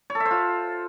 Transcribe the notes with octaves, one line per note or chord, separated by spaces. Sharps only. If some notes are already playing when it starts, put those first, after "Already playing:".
C#5
A4
E5
C5
F4